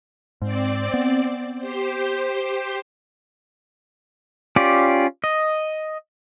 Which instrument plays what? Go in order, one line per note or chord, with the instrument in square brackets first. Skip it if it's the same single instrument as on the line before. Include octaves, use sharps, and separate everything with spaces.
[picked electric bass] G#2 [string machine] C4 D5
[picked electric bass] B3
[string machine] G4 C5
[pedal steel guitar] C#4 F4 G4 D5
D#5